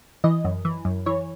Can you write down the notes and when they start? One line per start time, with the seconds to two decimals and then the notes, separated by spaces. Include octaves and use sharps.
0.24 E3 D#5
0.44 F#2
0.65 E3
0.85 F#2
1.06 E3 C#5